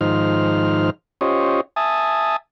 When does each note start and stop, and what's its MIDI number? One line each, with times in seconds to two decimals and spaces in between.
0.01 0.90 44
0.01 0.90 51
0.01 0.90 53
0.01 0.90 63
0.01 0.90 72
0.01 0.90 89
1.21 1.61 61
1.21 1.61 65
1.21 1.61 67
1.21 1.61 72
1.21 1.61 73
1.21 1.61 75
1.76 2.36 76
1.76 2.36 80
1.76 2.36 81
1.76 2.36 87